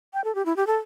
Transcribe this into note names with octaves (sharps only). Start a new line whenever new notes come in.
G5
A4
G4
E4
G4
A4